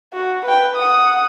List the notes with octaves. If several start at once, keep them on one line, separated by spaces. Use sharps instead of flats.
F#4
B4 G5
F#5 D#6